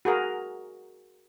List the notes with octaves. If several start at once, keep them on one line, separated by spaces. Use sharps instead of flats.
F#4 G#4 A#4